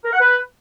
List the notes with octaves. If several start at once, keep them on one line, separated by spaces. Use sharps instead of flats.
A#4
F#5
B4